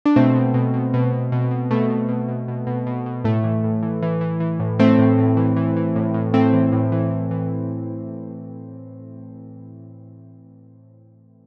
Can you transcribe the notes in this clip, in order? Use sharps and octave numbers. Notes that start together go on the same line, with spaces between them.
D4
B2 A3 C4
B2
B2
B2
B2
B2
B2
B2
B2 A3
B2
B2
B2
B2
B2
B2
B2
A2 A3
E3
A2
E3
E3
E3
E3
A2
A2 A3 C4
A2
A2
E3
E3
E3
A2
A2
A2 A3 C4
E3
A2
E3
E3
E3